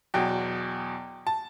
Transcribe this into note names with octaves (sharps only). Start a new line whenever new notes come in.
E2 B2 F#3 G5
A5